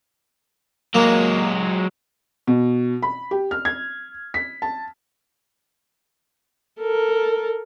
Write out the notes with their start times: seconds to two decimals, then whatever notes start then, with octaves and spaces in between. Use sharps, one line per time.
0.95 F#3 G#3 A#3
2.47 B2
3.02 B5
3.31 G4
3.51 F6
3.65 G#6
4.34 B6
4.62 A5
6.80 A4 A#4